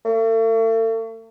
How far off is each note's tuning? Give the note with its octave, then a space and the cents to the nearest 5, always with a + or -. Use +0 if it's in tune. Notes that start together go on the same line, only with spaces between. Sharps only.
A3 +40